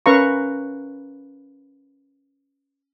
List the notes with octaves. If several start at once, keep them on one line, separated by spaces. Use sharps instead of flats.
C#4 A#4 B4 F5 A#5 C#6